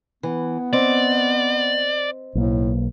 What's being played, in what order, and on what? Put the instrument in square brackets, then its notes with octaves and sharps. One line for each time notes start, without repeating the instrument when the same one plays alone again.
[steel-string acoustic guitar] E3 [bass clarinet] B3
[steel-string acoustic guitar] C4 D#5 [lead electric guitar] D5
[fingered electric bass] B1 A#3 [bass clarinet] A2